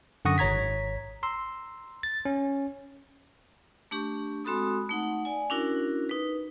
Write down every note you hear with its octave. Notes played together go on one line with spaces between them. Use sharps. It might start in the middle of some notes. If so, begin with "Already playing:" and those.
F#2 D3 F#5 C#6 D#6 A#6
G#1 C#5 A#5 G#6 B6
A#5 C6 E6
A6
C#4
A3 D4 G4 C#6
G#3 C4 F#4 A4 B5 D#6
A3 D#4 F#5
D5 G#5
C#4 D4 E4 F#4 A#4
D#4 B4